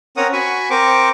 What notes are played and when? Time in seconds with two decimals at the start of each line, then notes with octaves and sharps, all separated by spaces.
0.17 C4 C#4 A#4 C#5 F#5 D#6
0.33 F#4 G#5 B5 C#6
0.70 C4 A#4 C5 G5 C#6 D6